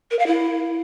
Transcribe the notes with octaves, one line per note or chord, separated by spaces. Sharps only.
A#4
F5
E4